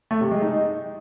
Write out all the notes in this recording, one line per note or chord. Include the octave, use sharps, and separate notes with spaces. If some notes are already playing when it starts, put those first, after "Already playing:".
A3
C3
G#3
D#4